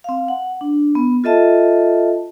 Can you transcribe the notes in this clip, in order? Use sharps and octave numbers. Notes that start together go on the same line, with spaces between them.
C4 F5
F#5
D4
B3
F4 A4 D#5 E5 A5